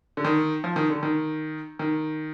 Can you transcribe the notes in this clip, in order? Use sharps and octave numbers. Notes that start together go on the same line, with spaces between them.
D3
D#3
F3
D#3
D3
D#3
D#3